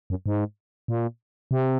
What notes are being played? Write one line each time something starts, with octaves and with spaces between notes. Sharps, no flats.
F#2
G#2
A#2
C3